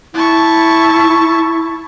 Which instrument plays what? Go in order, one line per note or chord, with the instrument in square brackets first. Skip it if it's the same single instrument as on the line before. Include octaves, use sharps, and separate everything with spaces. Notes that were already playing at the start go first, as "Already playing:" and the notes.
[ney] E4 [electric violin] A5 C#6